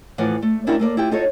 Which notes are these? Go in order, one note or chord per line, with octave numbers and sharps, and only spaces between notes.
A2 E3 F3 D5 F5 F#5
A3
C#4 D4 E4 F#4 A#4 G5
A3 A#3 D5
E4 F4 G4 G5
D#4 F4 F#4 A4 C#5